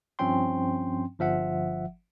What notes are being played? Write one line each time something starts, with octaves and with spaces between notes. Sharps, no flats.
G2 F3 C4 C#4 G5 C6
G1 F3 E5 F#5